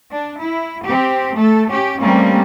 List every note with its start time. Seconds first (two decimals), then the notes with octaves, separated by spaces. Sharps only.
0.13 D4
0.43 E4
0.88 C4 G4
1.37 A3 A4
1.71 C#4 G4
2.01 G3 A3 A#3 C4 C#4